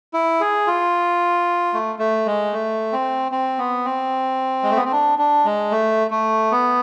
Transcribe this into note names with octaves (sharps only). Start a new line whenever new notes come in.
E4
G#4
F4
A3
A3
G#3
A3
C4
C4
B3
C4
G#3
A3
B3
C4
D4
D4
G#3
A3
A3
B3